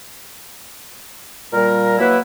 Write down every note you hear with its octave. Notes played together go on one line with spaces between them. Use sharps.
A#2 G3 A#4
F#3 A#3 E4 B4